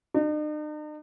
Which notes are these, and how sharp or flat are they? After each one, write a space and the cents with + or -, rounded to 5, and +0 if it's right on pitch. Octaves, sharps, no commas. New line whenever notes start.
D#4 -45